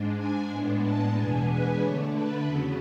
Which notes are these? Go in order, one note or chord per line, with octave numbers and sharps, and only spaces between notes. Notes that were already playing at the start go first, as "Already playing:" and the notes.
Already playing: G#2 G#3 D4
G#5
A2 G#3 B3 D4
A5
E2 B2 G#3 B3 D4 G#5
B4
D3 A3 D4 C#5
B4
E2 C#3 F#3 B3 A4